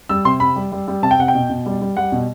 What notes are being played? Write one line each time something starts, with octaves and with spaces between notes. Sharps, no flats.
G3 E6
C3 C6
C3 B5
G3
G3
G3
C3 A5
G5
C3 F#5
G5
B2
B2
G3
G3
G3 F#5
B2